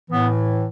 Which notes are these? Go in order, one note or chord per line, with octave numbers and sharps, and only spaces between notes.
A2 E3 B3